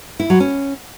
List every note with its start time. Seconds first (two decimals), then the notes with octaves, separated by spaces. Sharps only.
0.20 E4
0.30 F#3
0.40 C#4